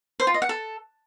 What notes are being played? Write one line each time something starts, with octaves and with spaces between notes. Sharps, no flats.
C5
F4
D#5
F#5
A4